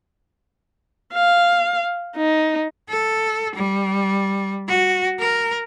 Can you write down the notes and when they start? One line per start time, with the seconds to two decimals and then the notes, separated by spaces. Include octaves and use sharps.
1.14 F5
2.16 D#4
2.89 A4
3.55 G3
4.69 F#4
5.19 A#4